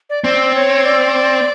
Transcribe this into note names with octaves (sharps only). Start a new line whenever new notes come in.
D5
C4 D5
C#5
D5